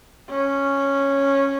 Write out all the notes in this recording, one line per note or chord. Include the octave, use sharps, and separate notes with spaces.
C#4